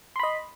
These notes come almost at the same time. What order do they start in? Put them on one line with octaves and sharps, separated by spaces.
C6 B5 D#5